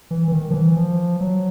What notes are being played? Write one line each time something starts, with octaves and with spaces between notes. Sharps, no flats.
E3
E3
D#3
F3
E3
F3
F#3